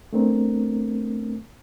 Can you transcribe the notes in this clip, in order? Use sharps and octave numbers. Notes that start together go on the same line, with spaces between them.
A3 B3 C4 D4 A#4